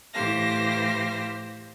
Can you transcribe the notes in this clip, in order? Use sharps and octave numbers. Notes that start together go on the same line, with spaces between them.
A2 E3 G4 C5 F5 A#6